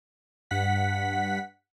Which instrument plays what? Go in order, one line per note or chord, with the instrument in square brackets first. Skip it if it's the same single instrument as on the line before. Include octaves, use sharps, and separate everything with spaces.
[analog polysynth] G2 F#5 B6